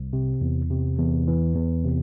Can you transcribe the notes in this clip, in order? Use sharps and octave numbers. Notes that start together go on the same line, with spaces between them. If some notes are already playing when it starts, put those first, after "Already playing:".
Already playing: C2
C3
E2
C3
E2
E3
E2
C3